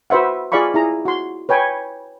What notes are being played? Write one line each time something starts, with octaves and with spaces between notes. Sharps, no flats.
F#4 B4 C5 E5 F#5
F4 G#4 D5 F5 B5 C#6
E4 G#4 A#5
F#4 C6
B4 C#5 G5 G#5